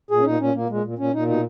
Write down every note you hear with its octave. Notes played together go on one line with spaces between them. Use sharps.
A#2 G#4
C#4
A#2 D#4
A#2 C#4
A#2 A#3
A#2 G#3
A#2
A#2 C#4
A#2 D#4
B2 D#4